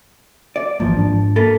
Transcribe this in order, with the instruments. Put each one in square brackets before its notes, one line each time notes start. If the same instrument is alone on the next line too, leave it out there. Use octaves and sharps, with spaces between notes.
[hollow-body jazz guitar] D5
[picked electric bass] G#1 E3 A#3 [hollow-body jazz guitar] F3
[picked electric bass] G#2 D4
[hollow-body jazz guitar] A#3 A4 B4